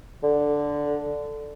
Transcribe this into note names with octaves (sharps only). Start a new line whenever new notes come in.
D3